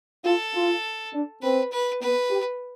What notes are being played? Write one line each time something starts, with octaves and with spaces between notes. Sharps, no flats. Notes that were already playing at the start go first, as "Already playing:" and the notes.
F4 A4
F4
D4
C4 B4
B4
B3 B4
G4